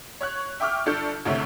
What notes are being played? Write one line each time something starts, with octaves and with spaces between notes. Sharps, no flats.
C#5 C#6 F#6
E5 G5 C#6 D6 E6 F6
G1 D4 A4 C#6 G6
F#1 D2 C3 A3 C#5